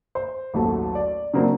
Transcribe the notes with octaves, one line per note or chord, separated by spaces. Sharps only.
C5
A1 D#2 F#3 A3
D5
C#3 F#3 A#3 C4 D4 C5